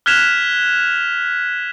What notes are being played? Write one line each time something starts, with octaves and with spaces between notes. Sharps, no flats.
F6 F#6 G#6 B6 E7 F7